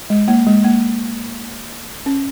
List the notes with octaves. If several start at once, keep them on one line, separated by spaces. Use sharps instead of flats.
G#3
A#3
G#3
A#3
C#4